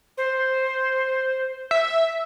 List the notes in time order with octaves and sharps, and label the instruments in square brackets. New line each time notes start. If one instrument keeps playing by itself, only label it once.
[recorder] C5
[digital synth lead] E5